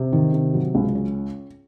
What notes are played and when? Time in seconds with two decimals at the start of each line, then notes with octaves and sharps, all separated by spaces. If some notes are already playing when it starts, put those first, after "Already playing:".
Already playing: C3
0.12 D#3
0.33 C3
0.54 F#3
0.75 C#2
0.95 C#4